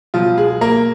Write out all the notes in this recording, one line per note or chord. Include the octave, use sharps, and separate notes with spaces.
B2 F3 F#3 F4
G#3 G#4
A#3 A#4